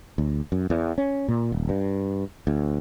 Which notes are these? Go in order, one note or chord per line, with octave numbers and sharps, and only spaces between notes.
D2
F#2
E2
C#4
A#2
D#1
G2
D2